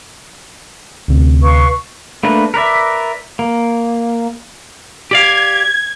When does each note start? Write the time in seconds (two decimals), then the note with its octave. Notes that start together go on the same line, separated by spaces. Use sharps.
1.08 D2 C3
1.43 B4 F5 C#6
2.23 A3 A#3 D4 B4
2.54 A#4 B4 D5 E5
3.39 A#3
5.11 G4 D5 F5 G#6